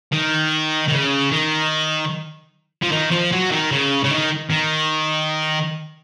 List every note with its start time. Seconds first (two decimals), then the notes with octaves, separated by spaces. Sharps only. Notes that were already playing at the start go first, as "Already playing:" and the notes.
0.13 D#3
0.88 D#3
0.92 C#3
1.32 D#3
2.83 F3
2.92 D#3
3.11 F3
3.32 F#3
3.51 D#3
3.71 C#3
4.04 C#3
4.11 D#3
4.51 D#3